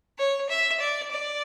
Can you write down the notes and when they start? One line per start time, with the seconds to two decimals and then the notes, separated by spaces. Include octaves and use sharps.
0.18 C#5
0.50 E5
0.80 D5
1.11 D5